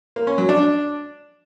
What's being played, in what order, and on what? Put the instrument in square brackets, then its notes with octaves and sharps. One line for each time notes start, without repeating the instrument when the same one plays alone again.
[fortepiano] A#3
C#4
F#3
D4